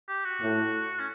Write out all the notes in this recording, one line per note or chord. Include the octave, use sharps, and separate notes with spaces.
G4
F#4
A2
C#4